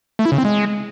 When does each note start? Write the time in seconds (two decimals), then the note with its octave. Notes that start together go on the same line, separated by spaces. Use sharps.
0.19 A3
0.26 E4
0.32 C#3
0.38 C4
0.45 G#3